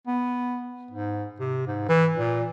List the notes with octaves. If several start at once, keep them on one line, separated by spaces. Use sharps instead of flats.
B3
G#2
C3
G#2
E3
A#2